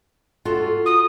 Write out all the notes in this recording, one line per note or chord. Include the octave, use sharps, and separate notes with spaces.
F4 F#4 A4
D#6